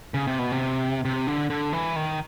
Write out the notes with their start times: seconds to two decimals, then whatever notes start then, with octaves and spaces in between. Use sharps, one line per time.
0.14 C#3
0.27 C3
0.39 B2
0.52 C3
1.05 C3
1.27 D3
1.50 D3
1.73 E3
1.96 D#3